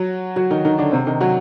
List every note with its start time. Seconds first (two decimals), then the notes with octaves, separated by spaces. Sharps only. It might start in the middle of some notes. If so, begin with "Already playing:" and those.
Already playing: F#3 F#4
0.36 F#3 F#4
0.50 D#3 D#4
0.65 D#3 D#4
0.78 D3 D4
0.92 C3 C4
1.07 D#3 D#4
1.21 F#3 F#4